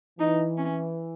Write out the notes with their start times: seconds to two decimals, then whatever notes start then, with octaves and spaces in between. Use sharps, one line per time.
0.19 E3 D#4
0.57 C#4